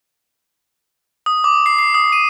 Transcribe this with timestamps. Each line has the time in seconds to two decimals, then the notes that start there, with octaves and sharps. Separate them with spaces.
1.26 D#6
1.44 D6
1.66 C7
1.79 C7
1.95 D#6
2.12 D#7